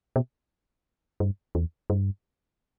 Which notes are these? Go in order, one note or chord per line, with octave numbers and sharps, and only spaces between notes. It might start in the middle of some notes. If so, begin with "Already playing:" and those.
B2
G2
E2
G2